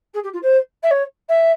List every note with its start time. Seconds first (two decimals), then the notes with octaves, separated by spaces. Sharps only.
0.14 G#4
0.23 G4
0.33 F4
0.42 C5
0.83 E5
0.91 C#5
1.29 E5